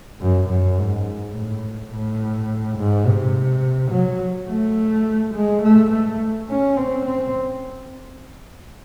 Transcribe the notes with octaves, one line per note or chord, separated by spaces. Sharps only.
F#2
F#2
G#2
A2
A2
G#2
C3
F#3
A3
G#3
A3
A3
C#4
C4
C4